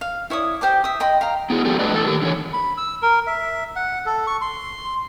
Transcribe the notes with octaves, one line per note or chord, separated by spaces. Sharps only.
F5
E4 C#5 D5 D#6
G4 C5 G5 D6
E5 D#6
D#5 G5 B5 C6
F5 G5 A#5
B3 E4 F#4 G#4
F3 B3 G4 A4
A2 A3 D4 B4 D5 D#5
A2 E3 A4 F5 A5
D#3 G4 A#4
D3 E3 C#5
B5
E6
A#4
E5
F#5
A4
C#6
C6